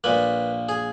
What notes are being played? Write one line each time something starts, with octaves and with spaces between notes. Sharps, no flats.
A#1 A#2 A#3 B4
G#4